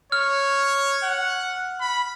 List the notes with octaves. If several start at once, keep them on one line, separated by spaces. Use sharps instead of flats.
C#5 F6
F#5
B5